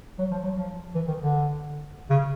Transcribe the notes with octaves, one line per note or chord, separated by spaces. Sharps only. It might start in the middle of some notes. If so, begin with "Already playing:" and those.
F#3
F3
F#3
F3
E3
D#3
D3
C#3